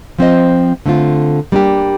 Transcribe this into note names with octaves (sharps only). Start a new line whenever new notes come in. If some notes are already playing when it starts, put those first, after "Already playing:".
F3 C4 F4 C5 D#5
D3 A3 C4 F4
G3 A#3 D4 G4